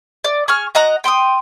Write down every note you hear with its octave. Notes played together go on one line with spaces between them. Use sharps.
D5
G#4 C#6 F6
F#4 D#5 A#5 F#6
G5 C6 D6 D#6